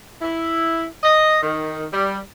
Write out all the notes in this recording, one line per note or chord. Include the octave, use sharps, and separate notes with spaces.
E4
D#5
D#3
G3